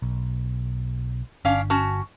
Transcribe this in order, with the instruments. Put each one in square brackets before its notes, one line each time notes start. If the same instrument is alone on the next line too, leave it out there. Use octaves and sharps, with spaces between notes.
[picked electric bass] B1
[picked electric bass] G1 [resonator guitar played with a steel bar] C#4 D4 F5
[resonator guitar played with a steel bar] C#4 F#4 A5